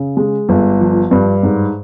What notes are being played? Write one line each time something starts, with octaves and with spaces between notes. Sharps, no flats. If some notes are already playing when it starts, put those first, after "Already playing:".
Already playing: C#3
G#3
G1
F3
G2
G#2